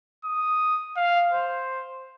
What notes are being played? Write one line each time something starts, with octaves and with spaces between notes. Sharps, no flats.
D#6
F5
C5